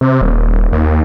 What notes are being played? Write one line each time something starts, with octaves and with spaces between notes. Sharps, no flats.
C3
D#1
D#2